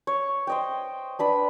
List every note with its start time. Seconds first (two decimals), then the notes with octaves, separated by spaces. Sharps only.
0.07 C#5
0.47 C5 D#5 G5
1.19 D4 B4 B5